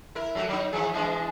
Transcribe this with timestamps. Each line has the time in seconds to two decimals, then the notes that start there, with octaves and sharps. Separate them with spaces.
0.15 E4 A#4
0.35 F#3 A3 F#4
0.49 F#3 D#4
0.73 E3 F3 G#4
0.94 E3 G#3 D4